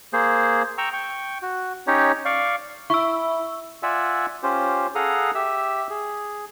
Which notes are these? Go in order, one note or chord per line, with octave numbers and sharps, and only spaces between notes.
A#3 G#4 C5
G5 A#5 C#6 E6
G5 C#6
F#4
C#4 D#4 G4 C#5
D5 F5 C#6
E4 C#6 E6
F4 D5 E5 F#5 G#5 E6
C#4 F4 G4 C5
G#4 A4 F5 F#5 A#5 D#6
G4 E5 E6
G#4